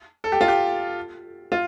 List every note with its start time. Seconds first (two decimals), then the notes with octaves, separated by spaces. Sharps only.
0.24 A4
0.32 G4
0.41 F4
0.48 G4
1.52 F4